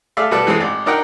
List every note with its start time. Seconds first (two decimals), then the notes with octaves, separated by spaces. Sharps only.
0.17 A3 G#4 D5 E5 F5
0.31 B2 G3 A4 B4 D5
0.47 E3 G#3 A3 C4
0.60 G#1 G#2 D5 D6
0.86 D4 D#4 A#4 D#5 F#5 G5